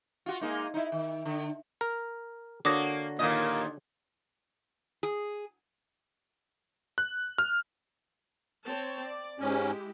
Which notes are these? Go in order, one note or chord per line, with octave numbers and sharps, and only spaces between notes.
F4 F#4
G#3 A#3 D#4
D#4 E4
D#3
D3
A#4
D3 A#3 F#4 C#5 D6 D#6 A#6
D#2 A#2 A#3 D#5
G#4
F#6
F6
C4 C#5 A5
D5
G#2 G#3 C#4 E4 G4